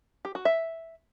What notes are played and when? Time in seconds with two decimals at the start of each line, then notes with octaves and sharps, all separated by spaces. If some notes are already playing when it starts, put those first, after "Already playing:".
0.25 G4
0.35 F#4
0.45 E5